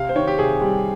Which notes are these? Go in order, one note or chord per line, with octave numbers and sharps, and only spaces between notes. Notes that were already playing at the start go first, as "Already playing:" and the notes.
Already playing: C3 F5
C5
D#3 C#5
G4
C3 G#4
G3